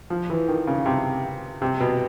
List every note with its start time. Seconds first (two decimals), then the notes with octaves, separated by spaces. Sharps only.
0.10 F3
0.30 E3
0.48 D#3
0.67 C#3
0.86 C3
1.62 C3
1.80 B2